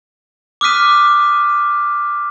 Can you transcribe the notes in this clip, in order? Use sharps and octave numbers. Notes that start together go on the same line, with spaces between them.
D6 D#6 F6 F#6 B6 D#7